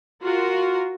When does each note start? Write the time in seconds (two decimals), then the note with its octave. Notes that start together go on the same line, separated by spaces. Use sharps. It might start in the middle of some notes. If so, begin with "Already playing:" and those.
0.21 F4 F#4 A#4